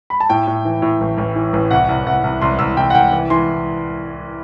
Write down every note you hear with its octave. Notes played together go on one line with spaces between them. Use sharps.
B5
A5
A2 G5
A2
E3
A2
A1
A1
E3
A1
C2 F#5
C2
C2 F#5
C2
C2 C6
C2 E6
C2 G5
F#5
C2 G5
E3
E3 C6